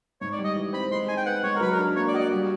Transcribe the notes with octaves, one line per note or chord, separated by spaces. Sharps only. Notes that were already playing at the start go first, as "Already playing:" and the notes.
G#2 C#5
D5
G3
D#5
E3
C4 B5
G#3 C6
D#4 G#5
G5
B3 F#5
G#3 C#5
A#4
F#3 B4
A#4
D4
A#3 C#5
D5
F#4 D#5
D5
G3